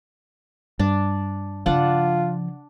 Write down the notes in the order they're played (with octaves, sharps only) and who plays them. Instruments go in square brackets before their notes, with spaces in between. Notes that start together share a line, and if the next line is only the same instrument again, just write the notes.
[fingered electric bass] G2 [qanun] D4
[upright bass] C#3 F3 [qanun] D4 F#5 [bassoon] F4